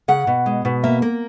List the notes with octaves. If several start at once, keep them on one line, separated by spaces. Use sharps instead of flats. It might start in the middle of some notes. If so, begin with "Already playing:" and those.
C#3 F#5
B2
G#3
B2
A#3 E5
A#3